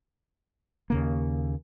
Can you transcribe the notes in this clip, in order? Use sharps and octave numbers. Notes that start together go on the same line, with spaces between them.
D#2 C#3 A#3